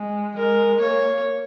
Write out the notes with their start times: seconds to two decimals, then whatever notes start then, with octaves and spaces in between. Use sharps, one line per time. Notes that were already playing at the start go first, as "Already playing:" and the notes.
Already playing: G#3
0.37 G#3 A#4
0.81 A#3 C#5